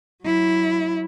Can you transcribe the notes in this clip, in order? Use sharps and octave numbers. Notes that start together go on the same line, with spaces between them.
F#3 E4